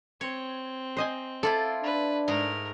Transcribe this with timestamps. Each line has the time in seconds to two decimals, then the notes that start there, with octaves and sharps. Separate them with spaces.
0.21 C4 C#5
0.97 C5 D#5 G#5
1.43 E4 F4 A4 D5
1.83 D4 B4
2.28 G#2 A3 A#4 A#5